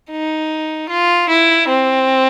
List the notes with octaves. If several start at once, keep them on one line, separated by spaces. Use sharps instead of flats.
D#4
F4
E4
C4